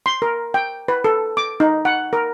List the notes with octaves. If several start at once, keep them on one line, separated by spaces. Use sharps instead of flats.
C6
A#4
G5
B4
A4
D6
D#4
F#5
A#4